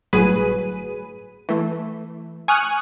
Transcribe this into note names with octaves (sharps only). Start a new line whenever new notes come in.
G1 A2 F#3 G#4 B4 D#7
E3 A3
G#5 C#6 D#6 F6 F#6